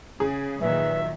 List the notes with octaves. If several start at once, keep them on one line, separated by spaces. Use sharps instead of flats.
C#3 G#4
A#2 D#3 F#3 B4 E5